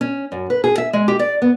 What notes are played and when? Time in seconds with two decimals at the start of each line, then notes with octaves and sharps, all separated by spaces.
0.01 C#4
0.32 F#2
0.50 B4
0.64 G#4
0.78 E5
0.93 G#3
1.08 G4
1.19 D5
1.42 B3